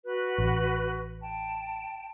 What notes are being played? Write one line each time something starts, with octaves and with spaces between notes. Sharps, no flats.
F#4 B4 F#6
A1
G5 A5